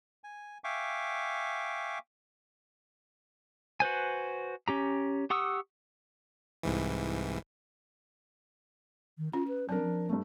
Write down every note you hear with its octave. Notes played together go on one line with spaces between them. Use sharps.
G#5
E5 F5 G5 G#5 C#6 D6
F#4 B4 C5 G#5
C#4 G4 A#5
G4 F#5 C#6 D#6 E6
C2 G#2 E3
D#3
C#4 F4
B4
F#3 C4 D4 A#4
F3
G2 A3